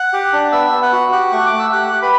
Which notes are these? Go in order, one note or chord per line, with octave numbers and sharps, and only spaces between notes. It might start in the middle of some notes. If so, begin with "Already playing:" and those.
Already playing: F#5 F#6
G4
D4
B3 E5 E6
B3
F#5 F#6
F#4
G4 F#5 F#6
A3 C#6
D6
A3
E6
G4 F#5 F#6
G4
B4 B5